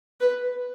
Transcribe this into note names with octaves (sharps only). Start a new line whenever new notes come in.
B4